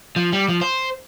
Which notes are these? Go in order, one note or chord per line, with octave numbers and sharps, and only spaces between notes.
F3
G3
F3
C5